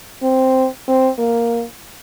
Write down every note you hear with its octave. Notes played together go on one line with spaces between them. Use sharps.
C4
C4
A#3